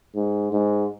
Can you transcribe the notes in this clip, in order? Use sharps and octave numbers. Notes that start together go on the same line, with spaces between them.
G#2
G#2